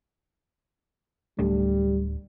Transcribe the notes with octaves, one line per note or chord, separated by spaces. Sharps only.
D1 G3 A3 D4